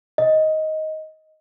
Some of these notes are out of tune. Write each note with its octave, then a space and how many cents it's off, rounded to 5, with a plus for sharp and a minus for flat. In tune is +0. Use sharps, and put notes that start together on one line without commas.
D#5 +10